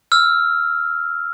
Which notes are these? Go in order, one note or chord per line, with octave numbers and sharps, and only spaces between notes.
E6 F6